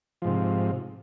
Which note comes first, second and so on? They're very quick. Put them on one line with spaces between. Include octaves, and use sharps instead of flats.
F3 G#2 C3